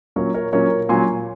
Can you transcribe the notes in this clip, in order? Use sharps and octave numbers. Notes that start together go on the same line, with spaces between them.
A#2 F#3 C#4 A#4 C#5
A#4 C#5
A#2 F#3 C#4 A#4 C#5
A#2 F#3 C#4 G#5 C6